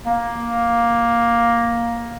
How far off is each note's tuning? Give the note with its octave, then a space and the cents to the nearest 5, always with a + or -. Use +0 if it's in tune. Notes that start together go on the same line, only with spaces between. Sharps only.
A#3 +10